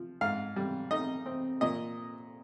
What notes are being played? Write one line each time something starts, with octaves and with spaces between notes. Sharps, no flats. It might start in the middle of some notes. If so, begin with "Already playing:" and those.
Already playing: F3
G#2 F5
G3
D#4 D#5
C4
A#2 D#5